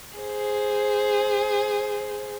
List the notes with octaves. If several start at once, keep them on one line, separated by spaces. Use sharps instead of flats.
G#4 C5